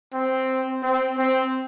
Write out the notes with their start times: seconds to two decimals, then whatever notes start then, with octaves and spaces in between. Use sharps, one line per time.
0.14 C4
0.83 C4
1.18 C4